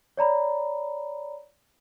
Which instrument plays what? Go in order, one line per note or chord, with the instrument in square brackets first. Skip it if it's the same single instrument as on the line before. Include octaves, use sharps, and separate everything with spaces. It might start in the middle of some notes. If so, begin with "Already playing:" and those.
[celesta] C#5 D5 A#5 B5